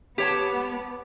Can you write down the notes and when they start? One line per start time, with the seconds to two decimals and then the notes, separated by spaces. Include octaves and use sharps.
0.18 B3 G4 C#5 A5